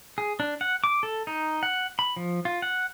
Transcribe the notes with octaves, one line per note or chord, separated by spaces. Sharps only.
G#4
D4
F#5
D6
A4
D#4
F#5
B5
F3
F4
F#5